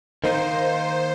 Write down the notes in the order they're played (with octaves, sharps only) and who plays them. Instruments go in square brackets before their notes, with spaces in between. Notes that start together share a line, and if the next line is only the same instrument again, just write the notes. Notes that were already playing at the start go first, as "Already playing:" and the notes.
[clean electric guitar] D#3 A#3 D#4 [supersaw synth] C5